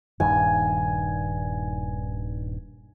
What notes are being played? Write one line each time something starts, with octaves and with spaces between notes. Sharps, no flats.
D#1 G2 D#3 G#5